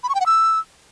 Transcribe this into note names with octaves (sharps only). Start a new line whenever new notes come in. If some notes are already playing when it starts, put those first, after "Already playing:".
B5
C#6
G5
F#5
E6